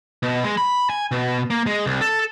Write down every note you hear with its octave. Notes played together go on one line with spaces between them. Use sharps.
B2
G#3
B5
G#5
B2
A#3
G#3
C2
A4